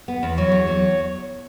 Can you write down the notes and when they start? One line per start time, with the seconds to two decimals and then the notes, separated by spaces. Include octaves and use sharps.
0.08 B3
0.23 E2
0.38 F#3 C#5
0.52 E2
0.67 F#3